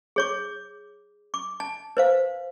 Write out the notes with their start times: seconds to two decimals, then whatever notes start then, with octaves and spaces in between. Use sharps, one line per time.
0.16 G#4 C#5 D6
1.34 D6
1.60 A5
1.97 B4 C5 F5